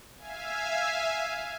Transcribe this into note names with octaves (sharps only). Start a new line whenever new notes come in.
E5 F5 G#5